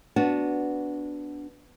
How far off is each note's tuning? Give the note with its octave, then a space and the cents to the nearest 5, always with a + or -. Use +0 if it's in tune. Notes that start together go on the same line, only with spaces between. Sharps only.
B3 +0 D4 -10 F#4 +0